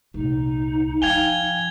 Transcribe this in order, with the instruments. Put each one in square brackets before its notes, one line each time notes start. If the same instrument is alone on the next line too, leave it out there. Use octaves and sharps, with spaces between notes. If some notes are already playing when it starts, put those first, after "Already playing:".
[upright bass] C2 A#2 [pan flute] D#4
[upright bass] F3 [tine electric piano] F5 G5 G#5 [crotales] G#6 F7 G7